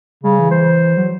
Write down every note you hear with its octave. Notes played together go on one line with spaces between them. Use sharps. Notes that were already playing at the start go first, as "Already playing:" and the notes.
C#3 G3
E3
C5
F#3